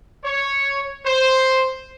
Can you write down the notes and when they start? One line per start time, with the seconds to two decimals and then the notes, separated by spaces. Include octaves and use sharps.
0.24 C#5
1.05 C5